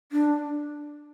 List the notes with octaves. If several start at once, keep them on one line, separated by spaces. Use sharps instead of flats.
D4